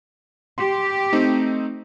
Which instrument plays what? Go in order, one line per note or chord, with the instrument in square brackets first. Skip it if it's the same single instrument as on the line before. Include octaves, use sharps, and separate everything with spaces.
[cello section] G4 [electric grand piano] C6
[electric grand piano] A3 C4 D#4